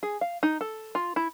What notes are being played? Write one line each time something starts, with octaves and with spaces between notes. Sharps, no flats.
G#4
F5
D#4
A4
F4
E4